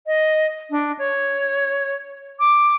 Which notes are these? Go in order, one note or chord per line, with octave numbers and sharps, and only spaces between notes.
D#5
D4
C#5
D6